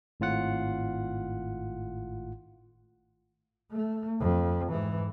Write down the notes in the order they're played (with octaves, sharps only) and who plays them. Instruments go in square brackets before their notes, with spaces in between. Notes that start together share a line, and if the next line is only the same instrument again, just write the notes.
[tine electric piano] G#1 A2 F4 F#5
[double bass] A3
F2
G#2 E3